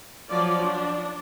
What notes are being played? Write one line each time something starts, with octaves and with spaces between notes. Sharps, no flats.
F3 F#3 F4 D5
D4